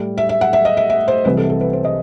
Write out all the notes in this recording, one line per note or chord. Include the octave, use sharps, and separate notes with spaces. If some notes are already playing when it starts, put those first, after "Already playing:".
Already playing: A2 G3
E5
E5
F#5
E5
D#5
E5
E5
C5
C2 C3 E3 B4
A4
A4
B4
C5
D#5